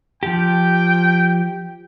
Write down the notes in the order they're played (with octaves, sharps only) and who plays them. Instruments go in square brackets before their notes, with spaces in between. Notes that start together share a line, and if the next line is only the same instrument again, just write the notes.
[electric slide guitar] F3 G4 [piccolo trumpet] G5